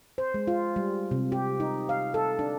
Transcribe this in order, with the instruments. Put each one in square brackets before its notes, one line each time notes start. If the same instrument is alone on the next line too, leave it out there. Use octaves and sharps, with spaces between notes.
[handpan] C5
G#3
F4
G3
C3
G4
D#4
F5
A4
D4